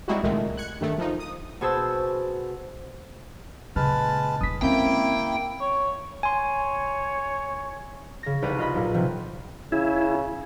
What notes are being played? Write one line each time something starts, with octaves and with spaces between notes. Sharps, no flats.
G3 G#3 C4 D#4 E4 F#4
C2 A#2 D#3 G#3 A3
F#6 G#6 C#7
G2 D#3 A3
F3 D#4
D#6
B2 F#4 G#4 C5 A5 E6
A#2 C#3 G#3 B4 A5 F6
E1 D#4 D#6 B6
D3 G#3 A#3 C4 C#4 E4 G5
C#5
C#5 G#5 C6
C#3 A#6
C2 D#4 B4 D5 A#5 D#7
F4 D#5 B5
B1 A#2
C3 F3 C4
C#3 E4